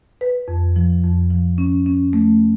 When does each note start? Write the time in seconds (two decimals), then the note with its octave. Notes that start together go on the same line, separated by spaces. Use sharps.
0.21 B4
0.48 F2
0.76 F3
1.03 F2
1.30 F3
1.58 C#4
1.86 C#4
2.13 A3